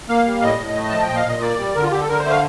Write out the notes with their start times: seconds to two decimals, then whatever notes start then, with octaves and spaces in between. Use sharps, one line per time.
0.09 A#3 F5
0.26 G3
0.42 A2 D#5
0.59 A2
0.75 A3
0.89 F3 A5
1.02 G5
1.09 A#2
1.16 F5
1.25 A#2 D#5
1.42 A#3 D5
1.59 G3
1.75 D3 A#4
1.83 F4
1.92 D3 G4
2.00 A4
2.08 D3 A#4
2.19 C5
2.25 A3
2.30 F5